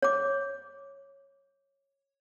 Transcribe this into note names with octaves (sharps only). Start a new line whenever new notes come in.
C#5 D6